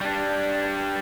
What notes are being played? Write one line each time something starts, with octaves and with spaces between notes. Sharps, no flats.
G3 D4